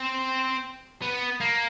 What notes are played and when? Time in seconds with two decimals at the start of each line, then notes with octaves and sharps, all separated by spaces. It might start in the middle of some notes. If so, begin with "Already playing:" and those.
Already playing: C4
1.02 B3
1.40 A#3